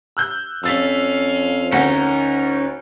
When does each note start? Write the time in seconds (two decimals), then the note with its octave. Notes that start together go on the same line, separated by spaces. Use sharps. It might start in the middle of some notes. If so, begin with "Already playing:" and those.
0.17 E6 F#6 G6
0.64 F2 C#4 F5 E6 A6 B6
1.72 D2 C#4 D#4 A#4 F#5